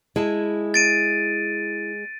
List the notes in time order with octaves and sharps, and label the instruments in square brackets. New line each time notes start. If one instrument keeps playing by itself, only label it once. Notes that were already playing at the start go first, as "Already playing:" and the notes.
[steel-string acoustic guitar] G#3 [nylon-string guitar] E4 G#4 A5
[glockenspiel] A6 D7 D#7